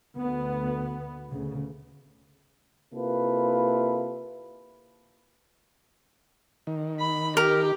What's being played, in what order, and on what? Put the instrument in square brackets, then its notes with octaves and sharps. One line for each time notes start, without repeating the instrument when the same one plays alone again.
[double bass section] D2 B3
D2 C#3
[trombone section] C3 A#3 E4 F4 A4 B4
[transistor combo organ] D#3
[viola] B5
[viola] G4 [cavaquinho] A#4